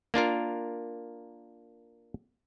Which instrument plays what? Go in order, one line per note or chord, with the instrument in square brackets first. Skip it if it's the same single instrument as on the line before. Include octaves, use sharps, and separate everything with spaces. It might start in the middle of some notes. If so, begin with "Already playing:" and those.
[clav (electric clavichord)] A#3 D4 F4 A#4